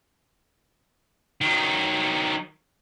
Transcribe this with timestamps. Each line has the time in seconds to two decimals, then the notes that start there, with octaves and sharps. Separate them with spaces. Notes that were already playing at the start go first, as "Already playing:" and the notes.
1.41 D#3 F#3